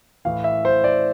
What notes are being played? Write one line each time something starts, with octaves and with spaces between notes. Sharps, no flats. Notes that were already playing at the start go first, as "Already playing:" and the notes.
A2 E3 F5
E5
C5
D5